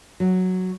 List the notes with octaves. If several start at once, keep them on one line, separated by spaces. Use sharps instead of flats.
F#3